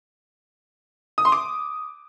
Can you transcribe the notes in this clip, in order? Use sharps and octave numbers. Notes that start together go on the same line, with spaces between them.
D#6
C6
D6